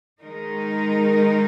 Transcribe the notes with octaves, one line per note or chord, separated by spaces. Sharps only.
D#3 G#3 D#4 A#4